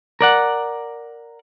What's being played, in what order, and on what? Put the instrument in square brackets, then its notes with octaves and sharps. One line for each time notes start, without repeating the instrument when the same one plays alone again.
[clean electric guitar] A#4 D5 F#5